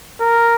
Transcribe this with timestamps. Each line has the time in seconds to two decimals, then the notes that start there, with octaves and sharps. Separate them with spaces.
0.21 A#4